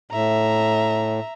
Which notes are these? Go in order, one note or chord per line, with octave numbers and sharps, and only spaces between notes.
A2 E5 A#5